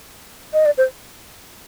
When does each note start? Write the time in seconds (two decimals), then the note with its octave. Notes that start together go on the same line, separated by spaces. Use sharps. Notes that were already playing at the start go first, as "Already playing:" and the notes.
0.53 D#5
0.66 D5
0.78 C5